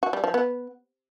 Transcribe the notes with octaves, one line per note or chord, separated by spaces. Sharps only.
F#4
G3
F3
B3